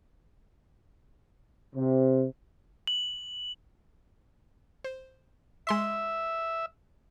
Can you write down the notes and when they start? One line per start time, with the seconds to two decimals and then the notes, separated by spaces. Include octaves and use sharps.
1.76 C3
2.87 F#7
4.84 C5
5.67 G#3 E5 C6 B6